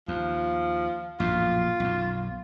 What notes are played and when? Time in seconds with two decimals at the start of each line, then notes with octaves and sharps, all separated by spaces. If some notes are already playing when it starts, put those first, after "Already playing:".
0.08 D#2 F3
1.20 A#1 F#2 A2 F4
1.80 B1 F#2